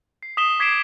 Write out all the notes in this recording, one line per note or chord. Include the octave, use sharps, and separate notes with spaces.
C7
D#6 B6 E7 G7
D6 G#6 B6 C7 D7 E7